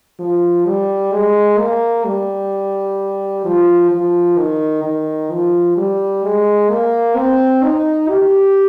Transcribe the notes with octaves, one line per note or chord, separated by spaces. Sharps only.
F3
G3
G#3
A#3
G3
F3
F3
D#3
D#3
F3
G3
G#3
A#3
C4
D#4
G4